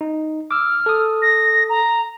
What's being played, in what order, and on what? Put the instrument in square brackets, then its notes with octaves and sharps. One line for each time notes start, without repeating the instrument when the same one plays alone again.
[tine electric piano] D#4
[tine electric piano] D6 E6 [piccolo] F6
[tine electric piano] A4 D#6
[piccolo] A#6
A#5